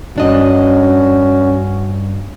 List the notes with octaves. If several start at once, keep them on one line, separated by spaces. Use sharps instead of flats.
G2 C#4 D4 F#4 D#5